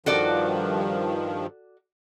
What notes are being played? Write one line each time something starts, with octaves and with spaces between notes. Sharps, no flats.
G2 D#3 F3 F#4 A4 D5